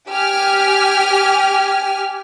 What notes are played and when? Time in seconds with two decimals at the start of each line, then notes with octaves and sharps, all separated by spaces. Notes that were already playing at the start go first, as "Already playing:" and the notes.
0.10 G4 G#5 F6